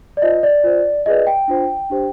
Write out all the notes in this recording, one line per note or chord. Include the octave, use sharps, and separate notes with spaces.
D5
F4 C5 D#5
D5
F4 C5
F4 G#4 B4 D5 D#5
G5
D4 F4 C5
D4 G4 C5